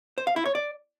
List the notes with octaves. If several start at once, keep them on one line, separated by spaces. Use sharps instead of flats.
C5
F5
E4
C#5
D5